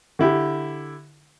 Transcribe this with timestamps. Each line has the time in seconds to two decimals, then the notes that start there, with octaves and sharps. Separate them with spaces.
0.19 D3 E4 G4